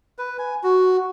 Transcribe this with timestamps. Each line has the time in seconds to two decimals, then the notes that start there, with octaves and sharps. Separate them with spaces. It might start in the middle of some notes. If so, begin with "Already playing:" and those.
0.18 B4
0.39 G#5
0.63 F#4